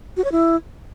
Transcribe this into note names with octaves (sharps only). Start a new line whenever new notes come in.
F#4
C#5
E4